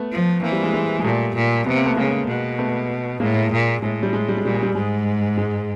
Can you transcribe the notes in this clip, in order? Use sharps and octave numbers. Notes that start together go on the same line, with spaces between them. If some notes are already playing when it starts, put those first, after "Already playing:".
Already playing: A3 B3
F3
E3 A#3 C4
G3
G#3
G#3
G#3
A#2 G3 A3
A#2
C3 B3
A#3
A3 B3
C#3 G#3 A#3
B2
A3 B3
A2 G#3 A#3
A#2
A2 G#3
G3
G#3
G3
G#3
A#2 G3
G#3
G3
G#2 G#3
G#3